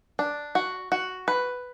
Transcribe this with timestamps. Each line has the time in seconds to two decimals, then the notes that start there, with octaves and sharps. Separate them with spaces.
0.19 D4
0.55 F#4
0.92 F#4
1.28 B4